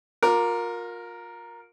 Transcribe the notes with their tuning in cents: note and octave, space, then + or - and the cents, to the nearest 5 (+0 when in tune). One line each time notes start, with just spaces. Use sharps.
F4 +35 A#4 +0 D6 +0